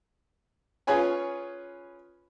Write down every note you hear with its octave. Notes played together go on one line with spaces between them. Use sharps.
C#4 F4 G#4 B4 C#5 G#5